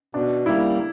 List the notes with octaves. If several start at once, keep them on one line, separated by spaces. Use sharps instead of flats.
B2 D4
G3 A#3 E4